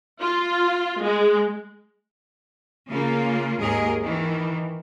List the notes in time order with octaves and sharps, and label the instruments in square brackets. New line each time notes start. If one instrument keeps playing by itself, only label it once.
[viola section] F4
G#3
[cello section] C#3 A#3 F4
D#2 G#2 G#4 A#4 D#5
D#3 E3